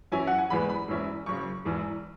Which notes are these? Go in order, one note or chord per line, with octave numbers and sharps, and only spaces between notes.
F#2 E3 C#4 E4 G#5
F#5
G#5
F#1 E2 E3 G#3 B3 B5
B5
E1 E2 E3 C#4 E4
F#1 F#2 C#3 C#6
E1 E2 E3